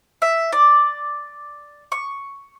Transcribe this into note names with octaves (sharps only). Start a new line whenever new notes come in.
E5
D5
C#6